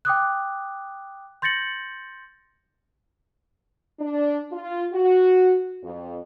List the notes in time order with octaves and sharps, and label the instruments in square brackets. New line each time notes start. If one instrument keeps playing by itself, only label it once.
[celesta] G5 D6 D#6 F#6
C6 G6 A6 A#6 C#7 F#7
[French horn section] D4
F4
F#4
F2